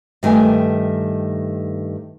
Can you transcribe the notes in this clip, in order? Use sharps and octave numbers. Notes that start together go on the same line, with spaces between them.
G2 D#3 A3 G#5